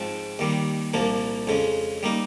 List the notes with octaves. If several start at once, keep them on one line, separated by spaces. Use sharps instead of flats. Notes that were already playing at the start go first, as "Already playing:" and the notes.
Already playing: G#2 F3 C4
D#2 D#3 G3
C2 A#2 F3 A#3
F2 C#3 G#3
G3 A#3 D#4